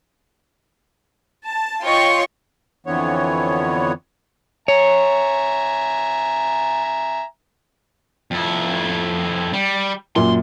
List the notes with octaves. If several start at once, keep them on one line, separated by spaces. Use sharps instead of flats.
A5
F4 C#5 D#5 G5 C6 C#6
F2 D3 E3 B3 C#5
C#5 E5 G#5 A#5
F2 E4
G3
F#2 A#2 C6